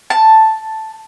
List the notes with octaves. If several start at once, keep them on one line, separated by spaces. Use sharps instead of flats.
A5